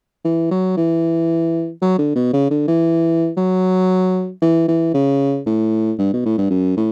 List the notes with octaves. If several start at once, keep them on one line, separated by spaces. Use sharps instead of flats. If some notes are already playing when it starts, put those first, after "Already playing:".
E3
F#3
E3
F#3
D3
B2
C#3
D3
E3
F#3
E3
E3
C#3
A2
G2
B2
A2
G2
F#2
A2